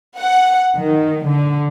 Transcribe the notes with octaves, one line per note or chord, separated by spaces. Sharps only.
F#5
D#3
D3